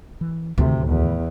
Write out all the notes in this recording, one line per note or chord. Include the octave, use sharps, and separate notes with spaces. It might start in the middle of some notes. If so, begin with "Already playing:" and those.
E3
D2 A2 C3 D#3 A3
E2